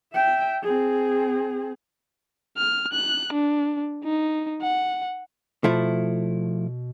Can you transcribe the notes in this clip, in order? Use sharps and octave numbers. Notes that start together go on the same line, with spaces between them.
E5 G5
C4 G#4
F6
F#6
D4
D#4
F#5
B2 F3 A3 E4